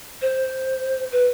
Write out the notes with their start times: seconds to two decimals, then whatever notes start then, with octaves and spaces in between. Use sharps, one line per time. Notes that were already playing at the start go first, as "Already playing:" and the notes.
0.21 C5
1.12 B4